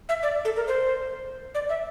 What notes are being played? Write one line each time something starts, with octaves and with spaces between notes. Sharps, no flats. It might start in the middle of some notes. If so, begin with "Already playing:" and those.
E5
D5
A4
A#4
C5
D5
E5